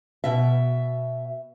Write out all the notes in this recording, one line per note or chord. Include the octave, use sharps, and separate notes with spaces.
B2 E5